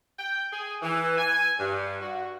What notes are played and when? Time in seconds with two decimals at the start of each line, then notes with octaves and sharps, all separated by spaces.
0.19 G5
0.52 G#4
0.82 E3
1.18 G#5
1.59 G2
2.01 F#4